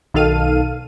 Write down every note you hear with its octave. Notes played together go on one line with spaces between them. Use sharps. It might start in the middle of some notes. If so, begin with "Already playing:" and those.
B1 D#3 A4 F5 D#7